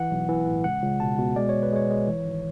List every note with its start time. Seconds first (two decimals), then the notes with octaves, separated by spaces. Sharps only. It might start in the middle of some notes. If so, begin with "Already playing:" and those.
Already playing: E3 F#5
0.11 B1
0.28 E3
0.46 A2
0.64 C#2 F#5
0.82 C#2
1.00 B2 A5
1.18 B2
1.36 G#3 D5
1.49 G#1 C#5
1.63 B4
1.72 G#3 C#5
1.90 G#3
2.08 E3
2.25 G#1